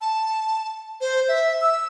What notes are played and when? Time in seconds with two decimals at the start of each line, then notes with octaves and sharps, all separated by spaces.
0.01 A5
1.01 C5
1.28 E5
1.61 E6